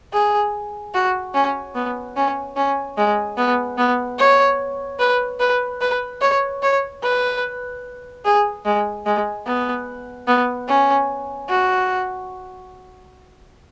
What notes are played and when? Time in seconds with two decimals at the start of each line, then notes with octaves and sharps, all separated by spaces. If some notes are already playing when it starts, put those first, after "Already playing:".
0.13 G#4
0.94 F#4
1.34 C#4
1.75 B3
2.16 C#4
2.56 C#4
2.97 G#3
3.37 B3
3.78 B3
4.19 C#5
4.99 B4
5.40 B4
5.81 B4
6.21 C#5
6.62 C#5
7.03 B4
8.25 G#4
8.65 G#3
9.06 G#3
9.46 B3
10.27 B3
10.68 C#4
11.49 F#4